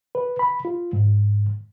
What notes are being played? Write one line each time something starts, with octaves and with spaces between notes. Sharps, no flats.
B4
B5
F4
G#2